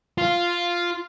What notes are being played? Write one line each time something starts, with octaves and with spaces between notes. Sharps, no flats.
F4